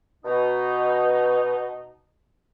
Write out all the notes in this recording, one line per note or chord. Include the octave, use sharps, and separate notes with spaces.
B2 D#4